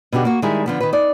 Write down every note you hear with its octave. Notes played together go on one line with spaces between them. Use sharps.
B2 D3 F#4 G4
A#3 F#4
D#3 G3 G#3 E4 G#4
D3 F3 B3
D#3 B4
D#4 D5